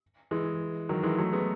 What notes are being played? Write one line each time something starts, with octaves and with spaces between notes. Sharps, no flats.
E3 G#3
D#3 F#3
E3 G#3
F#3 A3
G#3 B3